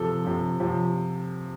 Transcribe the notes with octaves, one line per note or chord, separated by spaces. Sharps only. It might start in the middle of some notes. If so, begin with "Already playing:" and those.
Already playing: C3 F3 A4
C3 F3
C3 F3